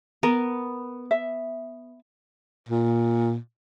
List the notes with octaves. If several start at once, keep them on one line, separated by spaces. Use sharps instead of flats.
B3 A#4
E5
A#2